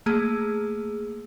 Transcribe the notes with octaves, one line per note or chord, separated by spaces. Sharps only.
A3 A#3 G#4